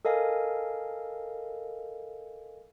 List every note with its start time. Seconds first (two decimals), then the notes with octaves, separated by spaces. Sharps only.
0.05 A4 A#4 D#5 F5 G#5